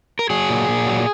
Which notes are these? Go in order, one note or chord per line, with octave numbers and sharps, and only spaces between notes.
A#4
F#3 G#4
A#2
A#2
F#3